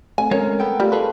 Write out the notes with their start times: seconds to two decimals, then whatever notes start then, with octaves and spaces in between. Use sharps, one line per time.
0.18 A3 C4 G#5
0.31 G#3 C#4 A#4 C#5
0.60 B3 A4 G5
0.80 G3 A3 F4
0.92 G#4 A4 B4